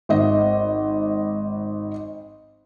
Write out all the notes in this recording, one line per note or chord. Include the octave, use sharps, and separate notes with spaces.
G#1 D#5